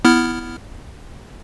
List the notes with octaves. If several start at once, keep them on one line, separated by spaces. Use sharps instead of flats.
B3 E4 F6